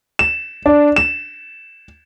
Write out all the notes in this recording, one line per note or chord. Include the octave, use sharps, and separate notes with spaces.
E7
D4
E7